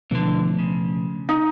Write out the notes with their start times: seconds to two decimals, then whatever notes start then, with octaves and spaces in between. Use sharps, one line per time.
0.11 B2 D3 E3 F3 A3
0.59 C#3
1.29 D#4